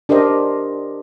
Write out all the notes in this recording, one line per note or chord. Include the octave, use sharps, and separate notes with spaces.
D4 G4 A#4 C5 D#5